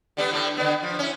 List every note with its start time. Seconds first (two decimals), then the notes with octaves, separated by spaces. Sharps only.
0.17 D3 G3 B3
0.31 A2 D3 G3
0.57 D3 B3
0.83 F3
0.99 C#4 E4